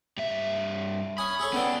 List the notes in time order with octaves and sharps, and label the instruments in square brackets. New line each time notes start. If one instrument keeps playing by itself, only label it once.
[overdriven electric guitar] G2 E5
[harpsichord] C#4 G#5 D#6 [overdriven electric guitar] B5
[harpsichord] G#4 A4 C#5
[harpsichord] B3 G5 [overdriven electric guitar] C#4 D5